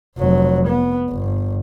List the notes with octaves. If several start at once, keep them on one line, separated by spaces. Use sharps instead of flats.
F1 F#3
B3
G1